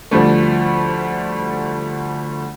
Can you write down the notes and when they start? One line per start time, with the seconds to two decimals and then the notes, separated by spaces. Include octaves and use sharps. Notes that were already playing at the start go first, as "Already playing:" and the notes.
0.11 D2 F3 G3 A3